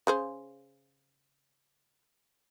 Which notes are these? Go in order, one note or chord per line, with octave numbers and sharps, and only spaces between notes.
C#3 G#4 C5